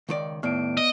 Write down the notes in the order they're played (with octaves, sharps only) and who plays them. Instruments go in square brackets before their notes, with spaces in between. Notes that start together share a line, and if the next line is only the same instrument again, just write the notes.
[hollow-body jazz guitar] C#2 D#3 D5
[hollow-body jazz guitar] D#2 A2 [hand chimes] B3 D5 D7
[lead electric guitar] D#5